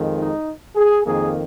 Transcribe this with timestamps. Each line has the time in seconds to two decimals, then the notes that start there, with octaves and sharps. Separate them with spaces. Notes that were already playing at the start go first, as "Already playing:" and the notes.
Already playing: F2 D#3 G#3
0.20 D#4
0.76 G#4
1.04 F2 D#3 A#3 G#4